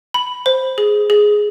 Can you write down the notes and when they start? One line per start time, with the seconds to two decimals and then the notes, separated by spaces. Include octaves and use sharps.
0.14 B5
0.46 C5
0.78 G#4
1.10 G#4